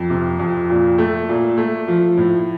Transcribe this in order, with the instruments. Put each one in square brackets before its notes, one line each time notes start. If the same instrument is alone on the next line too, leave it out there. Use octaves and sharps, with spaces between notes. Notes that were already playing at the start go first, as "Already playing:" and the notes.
Already playing: [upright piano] F2
C3
F2
A#2
A3
A#2
A3
F3
A2